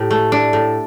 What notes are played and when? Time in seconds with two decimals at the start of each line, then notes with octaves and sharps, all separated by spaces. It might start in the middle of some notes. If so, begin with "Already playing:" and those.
Already playing: A2 G4
0.11 A3
0.32 D4
0.53 A2